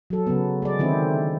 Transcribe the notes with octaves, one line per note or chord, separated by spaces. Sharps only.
F#3 A4
C#3 F#3 B3
G#3 D5
D3 D#3 C4 E4